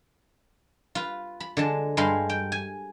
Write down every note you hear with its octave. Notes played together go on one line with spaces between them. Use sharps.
F4 B4
B5
D3 G#3 A5
G2 G#3 F5 B5 C6
G5
G#5